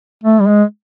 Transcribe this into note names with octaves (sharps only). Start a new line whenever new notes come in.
A3
G3
G#3